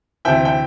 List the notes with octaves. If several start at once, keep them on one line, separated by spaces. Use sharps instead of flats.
D2 C3 E3 E5 G5
G5